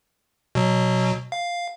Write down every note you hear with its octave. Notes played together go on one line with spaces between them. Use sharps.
B2 F#3
F5